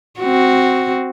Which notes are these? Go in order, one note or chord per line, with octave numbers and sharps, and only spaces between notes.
C4 F#4